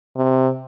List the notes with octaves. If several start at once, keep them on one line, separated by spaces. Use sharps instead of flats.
C3